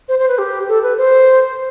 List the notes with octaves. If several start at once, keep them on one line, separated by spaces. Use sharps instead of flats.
C5
C5
B4
G4
A4
B4
C5